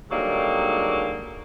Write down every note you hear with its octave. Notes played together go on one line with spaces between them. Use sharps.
G#2 D3 D#3 F#3 G3 A#3